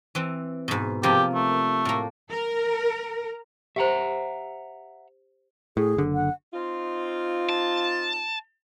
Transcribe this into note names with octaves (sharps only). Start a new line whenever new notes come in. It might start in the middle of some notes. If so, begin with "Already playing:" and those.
E3 C4
G#2 B2
C3 F3 A#3 G4
A3
A2 A#3
A#4
G4 C5 E5 F#5 A#5
A2 G#4
F#1 D3
F#5
C4 D#4 F4
A5